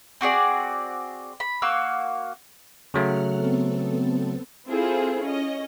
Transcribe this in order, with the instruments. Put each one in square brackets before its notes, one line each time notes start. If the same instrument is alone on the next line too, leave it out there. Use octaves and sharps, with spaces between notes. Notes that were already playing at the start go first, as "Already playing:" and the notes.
[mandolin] C4 F#4 G#4 D5
B5
A#3 F#4 F5 E6
[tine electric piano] C#3 F#3 A3 [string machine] F#5 F6
[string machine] B3 C4 A4
[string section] C4 E4 F4 G#4 A4 C5
C#4 D#5